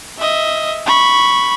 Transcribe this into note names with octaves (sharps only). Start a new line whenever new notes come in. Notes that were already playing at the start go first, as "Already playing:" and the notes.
D#5 E5
B5 C#6